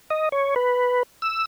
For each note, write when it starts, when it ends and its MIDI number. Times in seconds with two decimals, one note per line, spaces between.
0.10 0.29 75
0.32 0.54 73
0.56 1.03 71
1.22 1.45 88